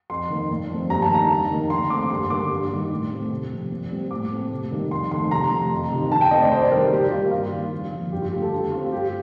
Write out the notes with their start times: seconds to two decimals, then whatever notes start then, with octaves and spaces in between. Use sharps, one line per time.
0.10 F2 C6
0.30 D#3 A#3
0.50 A#2
0.70 F3 A3 C4
0.90 G2 A#5
1.02 A5
1.10 D#3 A#3 A#5
1.30 F2
1.50 D#3 A#3
1.70 D3 C6
1.90 A3 C4 D6
2.10 G2 C6
2.30 D3 G3 A#3 D6
2.50 G2
2.70 D#3 G3 A#3
2.91 A2
3.11 A3 C4
3.31 C3
3.51 F3 C4
3.71 A#2
3.90 G3 C4
4.11 A2 D6
4.30 A3 C4
4.51 C3
4.71 D#3 G3 A#3
4.91 F2 C6
5.11 D#3 A3 C4 C6
5.31 C3 A#5
5.51 F3 A3
5.72 F2
5.91 C3 D#3
6.11 D3 A5
6.21 G5
6.31 A3 C4 D#5
6.41 D5
6.51 C3 C5
6.62 D5
6.72 D#3 G3 C4 A#4
6.82 A#4
6.92 A#2 G4
7.11 G3 A#3 F4
7.31 G2 F4
7.52 D#3 A#3
7.72 F2
7.92 D3 F3
8.12 G2 G4
8.22 F4
8.32 D3 A3 G4
8.42 A4
8.52 D3 G4
8.72 A3 C4 F4
8.92 G2 G4